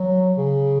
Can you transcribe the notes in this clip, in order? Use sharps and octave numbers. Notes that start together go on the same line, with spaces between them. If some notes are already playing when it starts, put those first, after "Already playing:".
Already playing: F#3
C#3